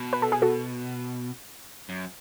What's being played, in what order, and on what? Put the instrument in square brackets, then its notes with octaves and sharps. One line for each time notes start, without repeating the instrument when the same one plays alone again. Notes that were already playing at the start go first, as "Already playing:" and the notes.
Already playing: [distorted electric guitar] B2
[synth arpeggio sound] B4
A4
G#4
F#4 A4
[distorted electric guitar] F#2